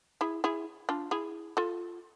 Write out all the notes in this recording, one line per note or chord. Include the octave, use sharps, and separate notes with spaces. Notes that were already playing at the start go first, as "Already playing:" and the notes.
E4 G#4
E4 G#4
D4 F4
E4 G#4
F4 A4